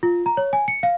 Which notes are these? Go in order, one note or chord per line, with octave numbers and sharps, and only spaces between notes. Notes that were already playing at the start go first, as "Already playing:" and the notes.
F4
A#5
C#5
G#5
C#7
F5